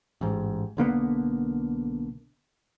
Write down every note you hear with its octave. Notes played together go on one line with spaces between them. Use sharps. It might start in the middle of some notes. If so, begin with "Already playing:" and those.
A1 G#2
B1 D3 A#3 B3